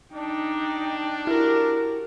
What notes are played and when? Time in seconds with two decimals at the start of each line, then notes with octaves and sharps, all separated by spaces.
0.14 D4 D#4 G5
1.27 E4 F#4 G4 A#4